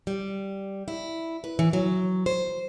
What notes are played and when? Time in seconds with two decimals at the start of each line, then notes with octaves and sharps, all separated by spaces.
0.07 G3
0.88 E4
1.44 B4
1.59 E3
1.73 F#3
2.26 C5